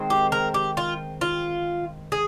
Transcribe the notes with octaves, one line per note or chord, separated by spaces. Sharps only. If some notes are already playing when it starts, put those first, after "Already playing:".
Already playing: D#3 G#3 C4
G4
A#4
G4
F4
F4
G#4